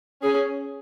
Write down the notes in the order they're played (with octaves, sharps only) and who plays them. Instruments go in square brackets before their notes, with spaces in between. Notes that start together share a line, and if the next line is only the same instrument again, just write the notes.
[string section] C#4 [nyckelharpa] G#4